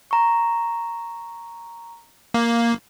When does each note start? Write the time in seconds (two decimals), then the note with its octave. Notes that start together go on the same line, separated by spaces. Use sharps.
0.11 A#5 C#6
2.34 A#3